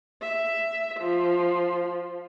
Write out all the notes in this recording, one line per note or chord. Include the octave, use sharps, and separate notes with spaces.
E5
F3